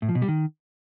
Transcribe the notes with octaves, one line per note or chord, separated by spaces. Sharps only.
A2
F3
B2
G3
D#3